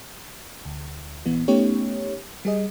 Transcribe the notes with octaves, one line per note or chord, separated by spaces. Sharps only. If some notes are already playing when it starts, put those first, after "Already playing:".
D2
A#1 E3 B3
A3 B3 C#4 D#4 G4 C#5
G3 G#4 D#5